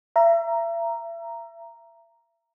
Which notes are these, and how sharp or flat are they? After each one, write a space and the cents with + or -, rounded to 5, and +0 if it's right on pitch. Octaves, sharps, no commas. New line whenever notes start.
E5 +35 A#5 +0